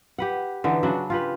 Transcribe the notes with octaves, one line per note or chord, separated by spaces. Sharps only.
G4 B4 F#5
D3 E3 D#4
C#3 F#3 D4 F#4
F4 G4 B4